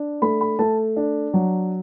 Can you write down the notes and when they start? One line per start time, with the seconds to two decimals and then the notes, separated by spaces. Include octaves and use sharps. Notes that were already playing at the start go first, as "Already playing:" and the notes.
Already playing: D4
0.22 A3 B5
0.41 B5
0.59 A3 A5
0.97 D4
1.34 F#3